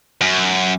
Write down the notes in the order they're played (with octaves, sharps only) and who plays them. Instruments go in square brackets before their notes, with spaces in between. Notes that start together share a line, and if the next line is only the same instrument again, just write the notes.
[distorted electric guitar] F#2